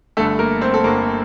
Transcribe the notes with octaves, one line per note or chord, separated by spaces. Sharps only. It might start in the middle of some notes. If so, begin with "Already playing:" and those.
G1 G2 D3 A3 A4
A#3 A#4
C4 C5
A4
G1 G2 D3 A#3 A#4